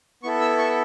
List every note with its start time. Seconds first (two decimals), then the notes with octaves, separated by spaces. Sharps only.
0.23 B3 E4 A4 C#6
0.41 E6
0.58 C#6